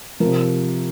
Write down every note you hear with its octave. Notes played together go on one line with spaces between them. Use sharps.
C3 F3 A#4